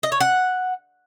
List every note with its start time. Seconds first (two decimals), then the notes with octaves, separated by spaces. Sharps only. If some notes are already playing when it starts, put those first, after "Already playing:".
0.03 D#5
0.12 C#5
0.20 F#5